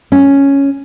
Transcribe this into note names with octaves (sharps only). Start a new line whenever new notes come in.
C#4